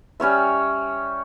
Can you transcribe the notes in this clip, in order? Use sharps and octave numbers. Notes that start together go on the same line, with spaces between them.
G3 C#4 C#5 E5